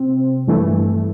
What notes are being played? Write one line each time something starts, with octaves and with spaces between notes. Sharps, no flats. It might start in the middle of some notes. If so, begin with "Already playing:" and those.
Already playing: C3 C4
G2 E3 A3